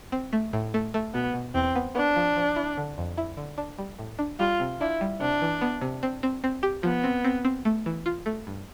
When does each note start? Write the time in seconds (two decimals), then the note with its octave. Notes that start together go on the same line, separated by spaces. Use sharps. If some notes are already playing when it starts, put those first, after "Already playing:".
0.12 C4
0.33 A3
0.53 A2
0.74 A3
0.94 A3
1.14 B2 B3
1.34 B2
1.54 E2 C4
1.76 B3
1.95 B3 D4
2.16 F3
2.36 F3
2.56 E4
2.78 D3
2.98 F2
3.18 E4
3.37 D3
3.58 D4
3.78 G3
3.99 A2
4.19 D4
4.39 G3 F4
4.60 C3
4.81 D4 E4
5.01 G3
5.21 C3 D4
5.42 E3
5.61 B3
5.81 C3
6.03 C4
6.23 C4
6.44 C4
6.63 G4
6.83 F3 B3
7.04 C4
7.24 C4
7.45 C4
7.65 A3
7.86 E3
8.06 F4
8.26 A3
8.47 G2